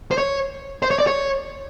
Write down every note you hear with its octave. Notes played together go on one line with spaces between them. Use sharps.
C5
C#5
C5
C#5
D5
C#5